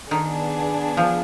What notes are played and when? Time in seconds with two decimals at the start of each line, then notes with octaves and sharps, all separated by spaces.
0.11 D#3 B3 D4 G#4
0.97 F3